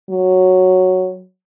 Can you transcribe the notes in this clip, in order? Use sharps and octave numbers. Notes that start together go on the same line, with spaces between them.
F#3